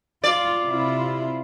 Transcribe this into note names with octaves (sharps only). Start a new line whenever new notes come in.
F4 D5
C3 E4 F4